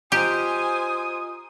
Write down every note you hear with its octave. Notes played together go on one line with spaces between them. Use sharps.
F4 G4 C5 D#5 G#5 A#5 D#6